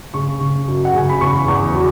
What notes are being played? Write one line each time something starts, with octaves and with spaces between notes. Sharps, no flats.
C#3 C#6
C#3
F#2
F#5
C#3 G#5
B5
E2 C#6
E2
F#3